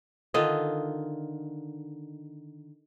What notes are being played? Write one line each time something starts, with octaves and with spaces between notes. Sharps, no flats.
D3 D#3 F4 D#5